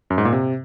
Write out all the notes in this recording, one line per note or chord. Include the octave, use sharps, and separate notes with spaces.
F#2
G#2
A#2
C3